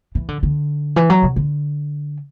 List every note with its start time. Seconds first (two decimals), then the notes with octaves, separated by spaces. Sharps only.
0.15 E3
0.28 D3
0.43 D3
0.96 E3
1.10 F#3
1.22 C3
1.36 D3